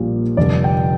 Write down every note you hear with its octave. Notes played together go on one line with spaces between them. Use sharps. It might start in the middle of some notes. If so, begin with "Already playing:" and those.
Already playing: A#1 A#2 G3 A#3
F1 F2 D3 G3 D5
G5